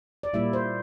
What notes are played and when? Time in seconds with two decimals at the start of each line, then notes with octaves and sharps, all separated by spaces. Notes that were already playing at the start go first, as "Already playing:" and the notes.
0.23 D5
0.33 A#2 G3 A#3 E4 E5
0.53 C5